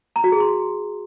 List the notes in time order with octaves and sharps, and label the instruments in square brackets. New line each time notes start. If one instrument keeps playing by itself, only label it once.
[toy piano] A#5
F#4
G#4
C6